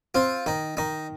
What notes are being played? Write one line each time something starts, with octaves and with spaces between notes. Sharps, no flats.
C4 F4
D#3 D#4
D#3 D#4